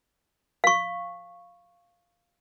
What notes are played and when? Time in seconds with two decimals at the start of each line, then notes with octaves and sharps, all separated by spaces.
0.64 F5 C#6